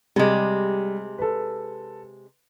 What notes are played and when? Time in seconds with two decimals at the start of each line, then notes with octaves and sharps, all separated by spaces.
0.16 C3 G3 G#3
1.18 A4 B4